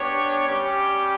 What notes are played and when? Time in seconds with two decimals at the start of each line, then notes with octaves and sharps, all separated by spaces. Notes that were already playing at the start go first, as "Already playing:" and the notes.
Already playing: B3 D4 G4 C#5
0.48 G3 C#4 G4